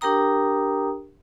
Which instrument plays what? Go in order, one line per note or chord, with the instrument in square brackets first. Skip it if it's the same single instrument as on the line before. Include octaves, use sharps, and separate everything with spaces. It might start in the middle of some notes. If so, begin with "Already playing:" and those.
[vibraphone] D4 G4 A#4 G5 A#5 D#6